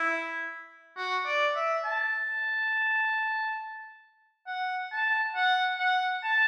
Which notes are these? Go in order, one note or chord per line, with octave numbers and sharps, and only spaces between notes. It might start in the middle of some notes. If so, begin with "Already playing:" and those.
Already playing: E4
F#4
D5
E5
A5
F#5
A5
F#5
F#5
A5